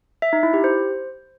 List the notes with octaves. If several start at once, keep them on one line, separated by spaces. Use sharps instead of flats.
E5
D#4
E4
G4
C5